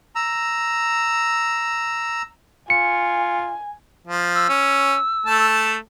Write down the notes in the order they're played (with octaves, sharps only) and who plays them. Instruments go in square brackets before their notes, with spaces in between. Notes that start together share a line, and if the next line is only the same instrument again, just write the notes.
[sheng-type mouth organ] A#5 E6
[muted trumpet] F4 [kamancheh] G#5 [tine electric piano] C#7
[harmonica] F3
[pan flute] E6
[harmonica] C#4
A3 A5